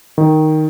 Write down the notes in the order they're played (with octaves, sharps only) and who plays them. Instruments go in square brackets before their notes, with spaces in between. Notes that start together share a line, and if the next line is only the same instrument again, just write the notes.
[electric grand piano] D#3